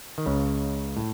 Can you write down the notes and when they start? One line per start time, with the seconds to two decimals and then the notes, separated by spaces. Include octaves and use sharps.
0.18 D#3
0.26 C#2 C#3
0.97 A2